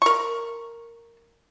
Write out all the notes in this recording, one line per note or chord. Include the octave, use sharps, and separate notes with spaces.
A#4 C#6